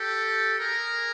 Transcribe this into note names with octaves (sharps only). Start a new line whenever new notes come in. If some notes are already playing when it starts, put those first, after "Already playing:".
Already playing: G4 A4
G#4 A#4